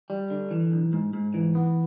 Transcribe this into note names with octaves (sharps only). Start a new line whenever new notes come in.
G3
D3
E3
B1
G#2
G#2
E3
B3